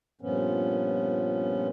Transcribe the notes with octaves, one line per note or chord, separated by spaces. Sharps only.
G2 A#2 F3 B3 C#4